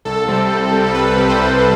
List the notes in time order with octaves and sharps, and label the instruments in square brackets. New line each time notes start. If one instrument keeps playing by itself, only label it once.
[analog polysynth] C2 A4
C3 G3 C4
C2
C3 G3 C4
A4
C2 B4
A4
C3 G3 C4 B4
C5
C2